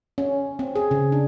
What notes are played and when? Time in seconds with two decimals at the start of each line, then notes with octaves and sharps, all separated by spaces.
0.18 C#4
0.59 C4
0.76 G#4
0.91 C#3
1.12 D4